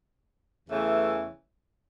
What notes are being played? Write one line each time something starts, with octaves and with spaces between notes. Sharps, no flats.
E2 C#3 E3 A3 C#4